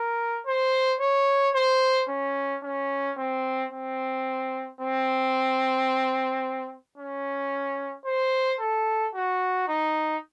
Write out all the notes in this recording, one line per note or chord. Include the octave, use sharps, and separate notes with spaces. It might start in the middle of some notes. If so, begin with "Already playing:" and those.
Already playing: A#4
C5
C#5
C5
C#4
C#4
C4
C4
C4
C#4
C5
A4
F#4
D#4